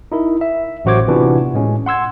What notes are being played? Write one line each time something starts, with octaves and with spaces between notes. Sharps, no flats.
D#4 E4 A#4
E5
A1 F#3 F#4 C5 D6 G#6
C3 E3 B3 D4 F4 F#4
A2 G#3 C#4
F#5 C6 E6 G#6